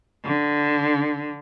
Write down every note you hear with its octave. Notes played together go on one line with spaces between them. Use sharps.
D3